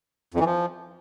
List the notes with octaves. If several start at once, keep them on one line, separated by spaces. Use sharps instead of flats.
F2
E3
F3